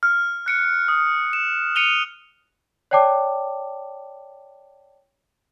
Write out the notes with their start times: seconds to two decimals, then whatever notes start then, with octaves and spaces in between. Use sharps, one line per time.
0.03 F6
0.46 F#6 C#7 D7
0.88 D#6
1.33 E7
1.76 C#7 D#7 F7 G7
2.91 C#5 D5 G5 A5 D6